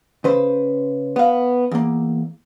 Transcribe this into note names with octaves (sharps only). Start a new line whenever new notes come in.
C#3 B4 C5
B3 F5
E2 A#3